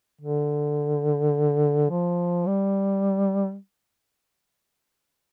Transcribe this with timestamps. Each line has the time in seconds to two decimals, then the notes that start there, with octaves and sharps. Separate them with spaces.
0.21 D3
1.90 F3
2.47 G3